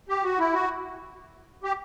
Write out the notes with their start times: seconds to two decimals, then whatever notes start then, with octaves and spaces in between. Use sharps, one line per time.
0.09 G4
0.23 F#4
0.39 E4
0.53 F#4
1.64 G4